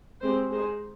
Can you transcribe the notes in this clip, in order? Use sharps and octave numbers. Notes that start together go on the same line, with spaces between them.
G#3 C4 G4 C5
G#3 D#4 G#4 C5